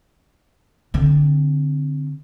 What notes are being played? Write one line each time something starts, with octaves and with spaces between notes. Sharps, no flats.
D3 C4